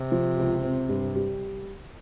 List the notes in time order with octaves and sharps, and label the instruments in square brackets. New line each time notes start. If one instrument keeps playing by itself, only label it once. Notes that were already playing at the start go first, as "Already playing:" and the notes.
Already playing: [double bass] C3
[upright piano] F3
C#2
C4
G2
G3